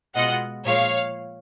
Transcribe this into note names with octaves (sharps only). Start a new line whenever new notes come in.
B2 G#3 B3 F4 D#5 F#5
A#2 F3 G#3 C#5 F5